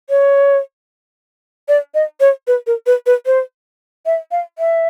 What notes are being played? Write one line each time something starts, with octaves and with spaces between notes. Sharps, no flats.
C#5
D5
D#5
C#5
B4
A#4
B4
B4
C5
E5
F5
E5